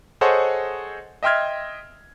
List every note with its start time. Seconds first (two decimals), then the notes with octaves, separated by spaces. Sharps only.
0.21 G#4 A4 C5 C#5 D#5 F#5
1.23 D#5 E5 G5 C6 F6 G#6